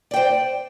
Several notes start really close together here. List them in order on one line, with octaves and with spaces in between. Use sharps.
D5 G5 C5